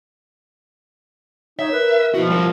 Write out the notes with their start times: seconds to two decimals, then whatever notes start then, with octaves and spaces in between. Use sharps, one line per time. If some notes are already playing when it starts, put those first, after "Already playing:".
1.59 D#4 C#5 E5
1.72 A#4 B4
2.14 F3 E4 F#4 B4
2.30 G3 F4 A#4